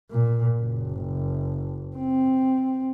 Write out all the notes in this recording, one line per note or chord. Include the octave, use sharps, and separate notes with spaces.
A#2
F#1
C4